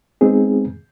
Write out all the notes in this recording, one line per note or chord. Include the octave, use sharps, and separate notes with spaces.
G#3 B3 C4 D#4 G#4